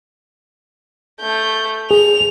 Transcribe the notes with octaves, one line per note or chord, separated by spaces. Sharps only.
A3 G6
G#4 F7